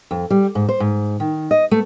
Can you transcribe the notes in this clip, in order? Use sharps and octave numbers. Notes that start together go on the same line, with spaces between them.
F2
G3
G#2
C5
G#2
D#3
D#5
A3